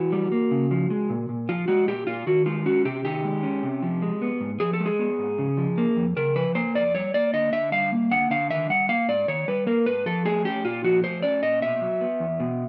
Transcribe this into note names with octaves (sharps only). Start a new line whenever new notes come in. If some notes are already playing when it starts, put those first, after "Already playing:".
Already playing: E3 F#4
G3
A#3
C#3
F3
G#3
A#2
A#2
F3 F4
G#3 F#4
A#2 G4
A#2 F4
D#3 F#4
G#3 F4
C#4 F#4
C3 G4
D#3 G4
G#3
C#4
C3
F3
G#3
B3
G#2
F3 G#4
A4
G#3
G#4
B3
G#2
C#3
F3
A#3
F2
C#3 A#4
F3 B4
A#3 C5
F2 D5
G3 C#5
A#3 D5
D3 D#5
D3 E5
G3 F5
A#3
D3 F#5
D3 F5
D#3 E5
G3 F#5
A#3 F5
G#2 D5
D#3 C#5
G3 B4
A#3 A#4
G#2 B4
F3 A4
A3 G#4
C#4 G4
A#2 F4
F3 F#4
A3 C5
C#4 D5
A#2 D#5
B2 E5
F#3
B3
E2
B2